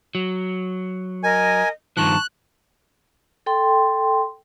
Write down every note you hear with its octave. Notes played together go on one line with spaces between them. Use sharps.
F#3
A#4 D#5 G#5
G2 D#3 F3 A5 C6 C#6 F#6
A4 G5 C6